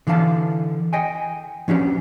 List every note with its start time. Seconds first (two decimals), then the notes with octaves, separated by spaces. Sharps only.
0.07 D3 E3 D4 F5 A5
0.93 D#5 G5 G#5
1.68 F3 C#4 D4 G4